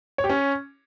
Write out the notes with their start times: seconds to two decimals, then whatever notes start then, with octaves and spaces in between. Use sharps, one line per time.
0.18 C#5
0.24 G4
0.29 C#4